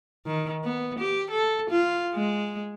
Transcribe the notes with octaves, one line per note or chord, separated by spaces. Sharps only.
D#3
B3
G4
A4
F4
G#3